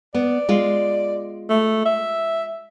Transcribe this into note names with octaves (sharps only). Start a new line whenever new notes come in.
B3 D5
G#3 F4
A3
E5